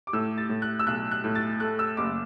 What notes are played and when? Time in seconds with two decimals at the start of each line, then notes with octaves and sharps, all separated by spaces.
0.07 D6
0.13 A2 E6
0.38 A6
0.49 A2
0.62 F#6
0.79 E6
0.86 B1 F#6
1.11 F#6
1.24 A2
1.35 A6
1.60 A3 F#6
1.79 E6
1.97 F#1 D6